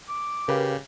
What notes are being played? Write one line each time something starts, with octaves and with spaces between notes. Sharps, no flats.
D6
C#3 G4 A#4 B4 F5